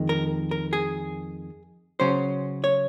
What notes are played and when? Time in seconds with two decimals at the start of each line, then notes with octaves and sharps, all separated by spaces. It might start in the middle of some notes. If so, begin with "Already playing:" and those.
Already playing: F2 D#3 G#3
0.09 A#4
0.51 A#4
0.73 G#4
2.00 C#3 F#3 C#4 C5
2.64 C#5